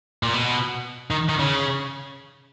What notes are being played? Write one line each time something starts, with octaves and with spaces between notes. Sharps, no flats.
A#2
B2
D#3
D#3
C#3